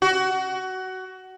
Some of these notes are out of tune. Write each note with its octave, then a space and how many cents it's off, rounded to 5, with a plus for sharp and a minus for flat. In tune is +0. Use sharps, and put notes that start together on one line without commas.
F#4 +20